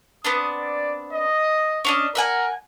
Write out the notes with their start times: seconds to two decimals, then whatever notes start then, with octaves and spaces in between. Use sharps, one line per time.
0.24 B3 C4 D4 D#6
0.60 D5
1.13 D#5
1.85 C#4 D4 D#5
2.15 A#4 E5 F#5 G#5